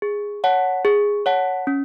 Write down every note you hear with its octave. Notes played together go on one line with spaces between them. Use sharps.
G#4
C#5 F#5 A5
G#4
C#5 F#5 A5
C#4